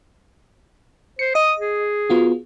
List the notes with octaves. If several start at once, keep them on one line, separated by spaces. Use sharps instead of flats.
C5 C#7
D#5 D#6
G#4
B3 F4 F#4